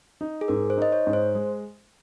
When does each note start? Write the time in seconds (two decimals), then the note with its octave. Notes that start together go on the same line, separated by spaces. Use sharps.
0.21 D#4
0.41 G#4
0.48 G#2 A#4
0.70 C5
0.77 D#4 D#5
0.92 C#5
1.07 G#2
1.13 C5
1.35 G#3